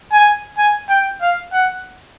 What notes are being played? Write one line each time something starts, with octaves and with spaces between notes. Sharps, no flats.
G#5
G#5
G5
F5
F#5